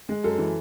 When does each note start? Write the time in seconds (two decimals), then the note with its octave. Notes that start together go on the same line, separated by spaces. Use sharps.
0.09 G#3
0.24 F#2 A4
0.38 E3